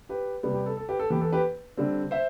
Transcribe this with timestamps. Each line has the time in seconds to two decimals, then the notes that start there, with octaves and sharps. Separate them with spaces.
0.09 G4 B4
0.43 C3 G3 B3
0.54 G4
0.66 A4
0.77 A4
0.89 G4 B4
0.99 A4
1.10 E3 G4
1.14 B3
1.21 A4
1.32 G4 B4
1.77 D3 G3 C4
2.11 C5 E5